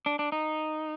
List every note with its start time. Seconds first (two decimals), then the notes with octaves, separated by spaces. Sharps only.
0.06 D4
0.19 D4
0.32 D#4